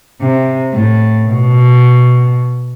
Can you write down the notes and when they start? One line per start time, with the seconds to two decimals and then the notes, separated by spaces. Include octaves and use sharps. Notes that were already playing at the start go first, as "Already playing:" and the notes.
0.21 C3
0.74 A2
1.27 B2